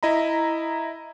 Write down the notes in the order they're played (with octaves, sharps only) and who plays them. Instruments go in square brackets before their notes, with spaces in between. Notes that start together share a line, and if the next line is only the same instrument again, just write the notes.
[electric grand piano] E4 D#5 A#5 B5